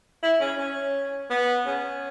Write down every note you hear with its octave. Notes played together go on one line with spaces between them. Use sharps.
E4
C#4
C#4
B3
C#4